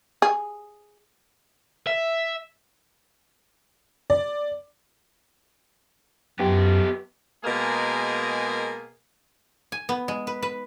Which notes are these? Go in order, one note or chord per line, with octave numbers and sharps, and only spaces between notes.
G#4
E5
D5
F#2 B3 G4
B2 G#3 A#3 G#4 A#4
G#5
B3
G#3
B4
B4